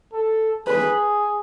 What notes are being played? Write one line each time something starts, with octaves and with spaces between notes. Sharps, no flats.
A4
G#4 B4